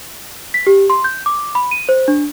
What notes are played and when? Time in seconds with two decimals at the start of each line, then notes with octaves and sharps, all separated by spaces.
0.54 B6
0.67 G4
0.90 C6
1.04 G6
1.26 D6
1.55 B5
1.71 D#7
1.89 C5
2.08 D4